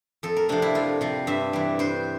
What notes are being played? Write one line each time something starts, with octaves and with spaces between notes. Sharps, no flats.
F2 A4
A#4
C3 F3 D4
E4
F2 F4
C3 F3
G2 E5
E3 G3
G2 C5